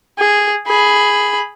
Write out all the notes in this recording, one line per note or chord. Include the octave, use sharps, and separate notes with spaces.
G#4
G#4 B5